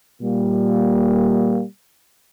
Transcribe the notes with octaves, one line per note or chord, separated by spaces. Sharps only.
A#2 G3 A#3